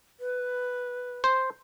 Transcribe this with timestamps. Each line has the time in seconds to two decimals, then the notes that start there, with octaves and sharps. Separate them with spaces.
0.20 B4
1.24 C5